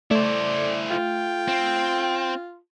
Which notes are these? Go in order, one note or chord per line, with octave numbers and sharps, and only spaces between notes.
A3 E4 C5 D5
F4 G5
C4